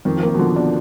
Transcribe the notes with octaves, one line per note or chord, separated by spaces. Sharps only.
F2 D#3
F3
A#3
D#3
B2
D3 F3
B2 D4